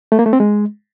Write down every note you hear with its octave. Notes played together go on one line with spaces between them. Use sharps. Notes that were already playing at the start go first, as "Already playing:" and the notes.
A3
A#3
A3
C4
G#3